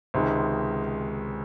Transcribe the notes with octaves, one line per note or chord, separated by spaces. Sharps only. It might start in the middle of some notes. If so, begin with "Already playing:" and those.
C#2 C3 D#3 G#3